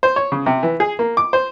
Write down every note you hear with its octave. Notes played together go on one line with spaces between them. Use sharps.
C5
C#5
C#3
C3
E3
G#4
A#3
D6
C5